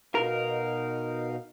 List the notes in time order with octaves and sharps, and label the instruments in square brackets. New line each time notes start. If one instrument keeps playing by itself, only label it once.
[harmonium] B2 D#4 F5 [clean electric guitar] A#4